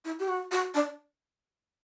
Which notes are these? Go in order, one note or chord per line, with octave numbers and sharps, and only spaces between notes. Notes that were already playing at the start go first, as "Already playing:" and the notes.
E4
G4
F#4
F#4
D4